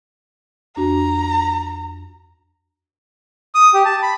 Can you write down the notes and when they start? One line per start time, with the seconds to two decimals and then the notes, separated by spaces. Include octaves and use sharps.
0.76 F2 D4 F#4 A#5
3.55 D#6
3.74 G4
3.85 A5
4.02 B5